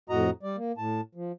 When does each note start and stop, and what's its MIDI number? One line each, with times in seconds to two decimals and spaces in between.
0.09 0.30 41
0.09 0.30 45
0.09 0.30 66
0.09 0.30 75
0.09 0.30 82
0.43 0.56 55
0.43 0.56 74
0.57 0.72 58
0.78 1.01 45
0.78 1.01 81
1.15 1.32 53